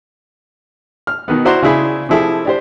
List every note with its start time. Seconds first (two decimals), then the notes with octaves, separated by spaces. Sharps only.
1.07 F6
1.28 B2 D#3 B3
1.45 E4 F#4 C5 D5 A#5 C6
1.63 C#3 D4 E4 G#4 B5
2.09 C3 F3 E4 G#4 A4
2.45 D4 G4 C5